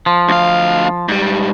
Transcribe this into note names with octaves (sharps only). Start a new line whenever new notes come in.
F3
D2 F5
G#2 G3